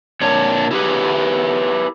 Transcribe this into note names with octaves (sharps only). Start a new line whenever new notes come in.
A#2 D4 C#5
E4 G4 G#4 B4